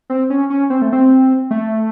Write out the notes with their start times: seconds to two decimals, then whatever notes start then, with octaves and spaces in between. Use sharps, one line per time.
0.10 C4
0.30 C#4
0.50 C#4
0.70 C4
0.82 A3
0.93 C4
1.51 A3